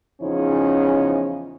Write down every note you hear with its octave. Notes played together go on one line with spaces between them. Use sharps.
E2 C#3 F3 C#4 D#4